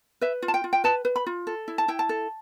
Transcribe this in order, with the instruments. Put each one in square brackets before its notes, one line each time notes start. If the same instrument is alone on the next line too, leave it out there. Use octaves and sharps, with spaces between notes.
[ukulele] B4 E5
F4
A5
G5
F4
G5
B4 A5
B4
B5
F4
A4
E4
A5
E4 G5
A5
A4